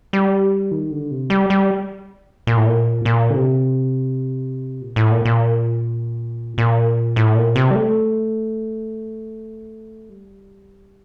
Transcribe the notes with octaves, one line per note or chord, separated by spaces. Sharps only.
G3
D#3
D3
C3
G3
G3
A#2
A2
A#2
A#2
D3
C3
A#2
A2
A#2
A#2
A#2
A2
A#2
C3
G3
A3
G3